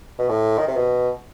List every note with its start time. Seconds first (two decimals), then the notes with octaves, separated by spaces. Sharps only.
0.19 B2
0.29 A2
0.58 D#3
0.68 C3
0.76 B2